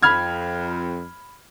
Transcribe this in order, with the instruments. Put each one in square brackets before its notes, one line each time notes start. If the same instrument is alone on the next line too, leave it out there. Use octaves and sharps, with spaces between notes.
[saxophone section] F2 [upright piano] B5 F6 G#6